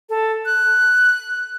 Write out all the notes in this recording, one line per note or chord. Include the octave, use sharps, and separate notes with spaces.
A4
F#6